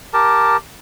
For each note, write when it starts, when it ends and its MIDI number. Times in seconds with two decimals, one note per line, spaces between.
0.13 0.57 67
0.13 0.57 70
0.13 0.57 81